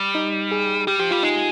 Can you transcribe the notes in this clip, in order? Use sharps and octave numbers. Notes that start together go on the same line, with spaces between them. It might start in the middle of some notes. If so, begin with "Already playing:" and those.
Already playing: G3
D#4
G#4
G3 G4
F3 G4
G3 F4
G#3 D#4